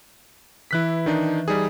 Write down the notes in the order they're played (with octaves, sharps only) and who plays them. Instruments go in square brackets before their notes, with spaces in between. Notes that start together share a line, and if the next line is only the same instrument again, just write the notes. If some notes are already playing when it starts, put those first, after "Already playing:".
[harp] E3 E6 [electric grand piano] E4 F#6 B6
[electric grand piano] D#3 D4 D#4
G3 D#4 G#4